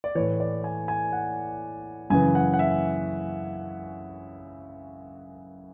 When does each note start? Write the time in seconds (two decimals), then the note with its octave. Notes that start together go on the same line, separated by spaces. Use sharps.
0.04 D5
0.15 A2 E3 C#5
0.40 D5
0.64 G#5
0.88 G#5
1.13 F#5
2.10 F#2 C#3 E3 G#5
2.35 F#5
2.54 F#5
2.59 E5